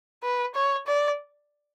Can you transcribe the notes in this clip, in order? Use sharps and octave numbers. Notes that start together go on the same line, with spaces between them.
B4
C#5
D5